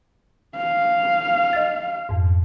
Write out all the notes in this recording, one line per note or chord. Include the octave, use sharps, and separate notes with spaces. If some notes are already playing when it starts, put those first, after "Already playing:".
F5
D#5 A6
F2 G#2